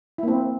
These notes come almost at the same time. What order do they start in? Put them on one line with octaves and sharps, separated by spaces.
E4 A#3 C4